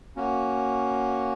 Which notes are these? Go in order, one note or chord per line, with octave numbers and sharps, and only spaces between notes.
A#3 C#4 F#4